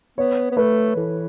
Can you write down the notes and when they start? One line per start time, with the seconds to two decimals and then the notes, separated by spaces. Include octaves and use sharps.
0.18 B3 C#5
0.51 B3
0.57 A3 B4
0.96 E3 A4